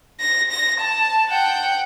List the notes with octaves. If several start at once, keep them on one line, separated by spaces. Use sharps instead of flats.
A#6
A#6
A5
F#5 G5